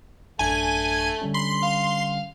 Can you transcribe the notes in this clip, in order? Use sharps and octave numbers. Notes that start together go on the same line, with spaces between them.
A1 F#2 A3 D4 G#5
D3 G3 C#4
B5 C6
F5